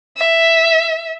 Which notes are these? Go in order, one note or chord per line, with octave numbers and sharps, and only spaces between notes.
E5